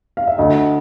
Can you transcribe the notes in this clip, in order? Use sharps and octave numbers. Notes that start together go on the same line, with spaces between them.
F5
E5
D2 D#5